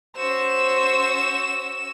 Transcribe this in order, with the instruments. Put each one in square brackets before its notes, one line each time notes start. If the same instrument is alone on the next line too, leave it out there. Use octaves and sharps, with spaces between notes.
[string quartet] C#4 F#4 [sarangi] C5 [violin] E6 E7